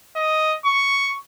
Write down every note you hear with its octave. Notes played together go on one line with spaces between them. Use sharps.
D#5
C#6